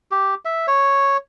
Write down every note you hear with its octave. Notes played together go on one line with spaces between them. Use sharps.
G4
E5
C#5